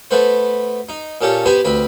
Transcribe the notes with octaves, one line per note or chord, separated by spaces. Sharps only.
A3 B3 B4 C5
D#4
A#2 C#4 G4 A4
B3 G4 B4 C5 G#5
D2 C4 B4 B5